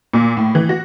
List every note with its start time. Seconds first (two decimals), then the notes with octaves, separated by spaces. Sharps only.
0.13 A#2
0.37 A2
0.55 E3
0.69 F#4